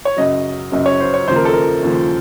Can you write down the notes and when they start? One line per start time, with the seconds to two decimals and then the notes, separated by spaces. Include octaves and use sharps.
0.05 C#5
0.17 F#2 C#3 F#3 D#5
0.72 F#2 C#3 F#3 D#5
0.86 C#5
1.00 C5
1.14 C#5
1.28 D#2 C#3 F3 C5
1.36 A#4
1.45 A4
1.54 A#4
1.83 D#2 C#3 F3